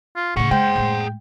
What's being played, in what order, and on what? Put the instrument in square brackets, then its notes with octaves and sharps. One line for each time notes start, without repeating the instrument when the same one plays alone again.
[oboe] F4
[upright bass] A2 C#3 [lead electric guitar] G#4 F#5 [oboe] C#6
[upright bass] G#3 [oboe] C5 [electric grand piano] G5
[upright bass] A2 G#3